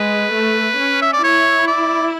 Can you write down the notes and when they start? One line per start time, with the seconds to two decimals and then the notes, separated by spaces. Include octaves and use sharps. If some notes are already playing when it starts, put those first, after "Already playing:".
Already playing: G#3 B4
0.36 A3
0.79 C#4
1.02 E5
1.13 D5
1.23 E4 C#5
1.67 D5